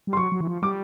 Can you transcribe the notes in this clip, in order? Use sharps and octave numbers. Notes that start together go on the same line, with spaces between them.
G3
C6
F#3 C#6
F#3
E3
F3
G3 D6